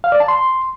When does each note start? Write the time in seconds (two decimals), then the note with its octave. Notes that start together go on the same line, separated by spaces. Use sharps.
0.04 F5
0.12 D5
0.20 A5
0.28 C6